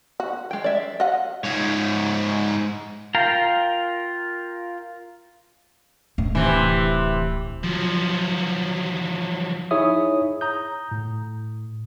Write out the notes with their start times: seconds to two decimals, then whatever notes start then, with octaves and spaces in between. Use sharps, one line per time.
0.20 F#4
0.51 G#3 G5
0.64 D5 E5
1.00 D#5 F5 F#5
1.44 G#2 C#5
3.15 F4 A#4 F5 G5 A#5
6.18 D1
6.35 C3 E3
7.64 F3 F#3
9.71 D#4 E4 G#4 C#5 E5 D#6
10.41 A#5 D#6 G6
10.91 A2